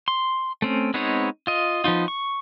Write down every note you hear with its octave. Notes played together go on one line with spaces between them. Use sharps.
C6
A3 C4 C#4
G#3 B3 C4 D#4 C#5
F4 D#5
F3 B3 D#4 F4
C#6